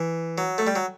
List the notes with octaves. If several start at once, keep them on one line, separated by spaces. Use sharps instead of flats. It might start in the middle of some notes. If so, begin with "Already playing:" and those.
Already playing: E3
F#3
A3
G3
F#3